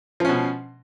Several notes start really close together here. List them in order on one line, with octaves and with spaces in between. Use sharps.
F3 C#4 B2